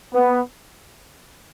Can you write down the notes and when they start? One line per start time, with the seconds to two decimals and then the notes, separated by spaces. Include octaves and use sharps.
0.13 B3